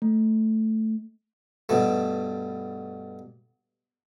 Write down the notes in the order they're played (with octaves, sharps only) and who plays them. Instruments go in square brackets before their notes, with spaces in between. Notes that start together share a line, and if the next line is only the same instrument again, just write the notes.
[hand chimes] A3
[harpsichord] G2 B2 A3